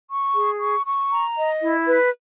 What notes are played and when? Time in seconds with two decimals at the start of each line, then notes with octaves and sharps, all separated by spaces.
0.09 C#6
0.35 G#4
0.60 C#6
0.86 C#6
1.11 A#5
1.36 D#5
1.61 E4
1.86 B4